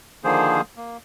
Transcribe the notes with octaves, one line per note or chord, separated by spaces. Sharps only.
D3 D#3 F3 A#3 G#4 C5
A#3